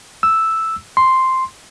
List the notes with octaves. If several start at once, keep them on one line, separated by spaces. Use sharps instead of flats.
E6
C6